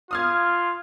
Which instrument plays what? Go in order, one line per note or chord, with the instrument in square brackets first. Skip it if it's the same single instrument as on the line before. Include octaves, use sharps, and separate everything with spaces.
[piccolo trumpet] F4 [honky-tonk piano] D#6 F6 G#6